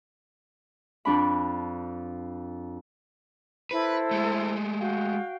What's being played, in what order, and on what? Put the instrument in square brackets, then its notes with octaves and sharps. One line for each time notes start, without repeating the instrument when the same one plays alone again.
[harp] F2 D4 B5
[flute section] E4 A4 C5 [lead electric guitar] B4
[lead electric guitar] G#3 A3
[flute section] F#4 F5 G5